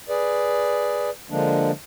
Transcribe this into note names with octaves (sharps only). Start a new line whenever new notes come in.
G#4 B4 D5
D3 F3 G#3 A#3 D4